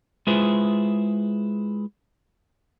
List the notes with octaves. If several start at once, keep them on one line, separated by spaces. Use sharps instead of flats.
G#3 E4 F4 G#4 B4 C5